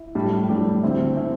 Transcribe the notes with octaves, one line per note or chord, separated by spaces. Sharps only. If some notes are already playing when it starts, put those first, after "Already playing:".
Already playing: E4
A2 G3 D4
A2 G3 D4 G4
D2 D3 C4 E4
D3 C4 E4